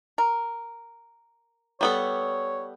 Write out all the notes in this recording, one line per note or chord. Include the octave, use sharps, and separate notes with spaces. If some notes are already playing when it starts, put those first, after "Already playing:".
A#4
G3 B3 A4 C#5